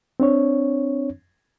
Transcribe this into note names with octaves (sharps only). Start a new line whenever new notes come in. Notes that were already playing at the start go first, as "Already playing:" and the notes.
C4 D4 C#5